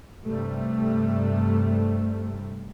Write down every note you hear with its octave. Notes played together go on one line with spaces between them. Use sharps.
G2 C3 G3 A3